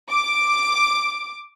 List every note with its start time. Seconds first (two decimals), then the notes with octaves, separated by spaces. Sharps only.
0.11 D6